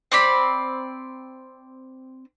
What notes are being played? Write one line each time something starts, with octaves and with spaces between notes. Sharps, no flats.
C4 D5 B5